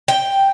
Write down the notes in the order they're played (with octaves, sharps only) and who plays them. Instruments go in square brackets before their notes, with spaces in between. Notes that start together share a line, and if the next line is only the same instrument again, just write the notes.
[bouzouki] G5